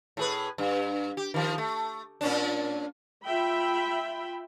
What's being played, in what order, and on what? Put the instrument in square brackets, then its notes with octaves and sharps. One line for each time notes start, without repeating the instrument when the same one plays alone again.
[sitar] A2 G#4 B4
G2
G4
D#3 F3
A3
A#2 C#4 D4
[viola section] F4 E5 G5 B5